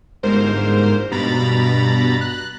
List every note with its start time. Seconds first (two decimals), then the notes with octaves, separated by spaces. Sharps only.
0.23 G1 G#2 A#4 C5
1.11 G2 B2 A#5 B5 A6
2.21 F#6